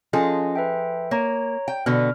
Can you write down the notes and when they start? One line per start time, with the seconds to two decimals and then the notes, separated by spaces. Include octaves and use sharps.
0.13 F3 C#4 F4 G#4 A4 D#5
0.55 B4 E5 G5
1.11 A#3 C#5 A#5
1.68 G5
1.86 B2 D3 B3 F6